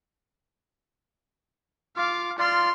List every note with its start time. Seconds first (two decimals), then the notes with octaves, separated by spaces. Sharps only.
1.96 F4 F5 D6
2.39 F4 D5 C6 F6